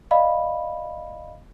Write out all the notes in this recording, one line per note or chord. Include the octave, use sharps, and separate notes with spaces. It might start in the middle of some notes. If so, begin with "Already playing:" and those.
D5 D#5 F5 B5